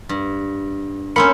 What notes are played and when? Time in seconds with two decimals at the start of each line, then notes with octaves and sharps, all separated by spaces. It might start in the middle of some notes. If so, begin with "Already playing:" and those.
0.09 G2
1.16 A#3 C4 C#4 A#4 B5 C#7